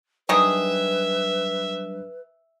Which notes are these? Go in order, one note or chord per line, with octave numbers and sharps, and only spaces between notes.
D#3 F#3 G3 D4 G#4 B4 E5